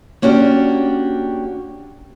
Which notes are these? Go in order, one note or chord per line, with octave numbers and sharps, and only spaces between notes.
A#3 C#4 D4 F#4 G4